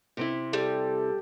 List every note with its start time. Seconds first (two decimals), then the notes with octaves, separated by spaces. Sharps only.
0.17 C3 C4 E4
0.53 G3 A4